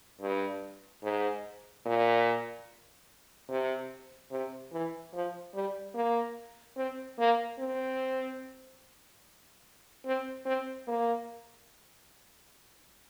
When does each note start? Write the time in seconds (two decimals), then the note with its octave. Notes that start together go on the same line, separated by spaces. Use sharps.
0.21 G2
1.03 G#2
1.86 A#2
3.49 C3
4.31 C3
4.72 E3
5.14 F3
5.54 G3
5.94 A#3
6.76 C4
7.18 A#3
7.59 C4
10.05 C4
10.45 C4
10.87 A#3